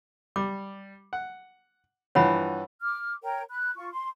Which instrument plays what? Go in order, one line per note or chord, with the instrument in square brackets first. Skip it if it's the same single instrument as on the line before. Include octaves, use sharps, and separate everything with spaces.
[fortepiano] G3 [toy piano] D6
[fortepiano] F#5
[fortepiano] G2 E3 F3 [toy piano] C#5 F#5 B5
[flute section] D6 F6
A#4 C#5 G5 A#5
B5 F#6
F4 C#6
C6